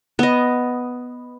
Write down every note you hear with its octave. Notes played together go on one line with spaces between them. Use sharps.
B3 D#5